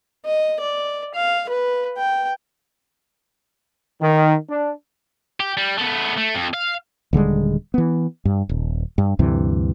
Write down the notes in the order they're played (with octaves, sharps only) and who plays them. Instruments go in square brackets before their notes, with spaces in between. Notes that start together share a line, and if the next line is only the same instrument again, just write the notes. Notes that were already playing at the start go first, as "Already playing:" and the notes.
[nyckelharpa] D#5
D5
F5
B4
G5
[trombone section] D#3
D4
[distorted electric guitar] G4
G3
A3 B3
A3
F2
F5
[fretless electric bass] D#1 D3 G3 G#3
E3 B3
G2
D#1
G2
D2 G2 C3 E3